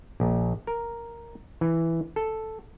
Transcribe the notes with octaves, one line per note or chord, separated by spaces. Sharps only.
A#1
A#4
E3
A4